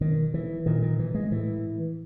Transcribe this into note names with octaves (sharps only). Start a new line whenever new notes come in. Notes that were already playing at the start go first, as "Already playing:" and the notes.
B2 D#3
E3
A#2 D#3
D#3
E3
G#3
A2 E3